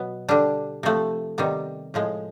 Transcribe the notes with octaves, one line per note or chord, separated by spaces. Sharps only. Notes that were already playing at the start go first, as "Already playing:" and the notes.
Already playing: B2 F#3 B3
D3 G3 D4
C3 F3 A3
C3 D#3 G3 B3
A2 F3 G#3